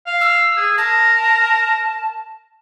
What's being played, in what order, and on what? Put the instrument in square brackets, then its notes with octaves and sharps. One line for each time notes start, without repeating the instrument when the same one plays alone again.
[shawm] F5
[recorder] E6
[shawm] G#4
[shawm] A#4 [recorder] A5